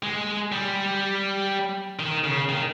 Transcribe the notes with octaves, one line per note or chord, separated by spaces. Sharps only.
G#3
G3
D#3
C#3
D#3